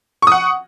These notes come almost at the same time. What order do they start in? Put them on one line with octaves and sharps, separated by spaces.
C#6 D#6 F#5